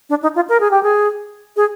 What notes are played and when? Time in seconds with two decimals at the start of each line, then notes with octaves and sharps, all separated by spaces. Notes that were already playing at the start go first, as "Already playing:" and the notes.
0.10 D4
0.23 D#4
0.35 F4
0.49 A#4
0.60 G#4
0.71 G4
0.83 G#4
1.56 G#4